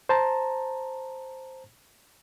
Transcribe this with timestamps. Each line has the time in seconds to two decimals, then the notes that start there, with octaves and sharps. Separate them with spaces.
0.09 C5 A5 A#5